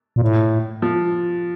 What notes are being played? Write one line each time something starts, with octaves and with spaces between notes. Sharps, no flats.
A#2
A2
F3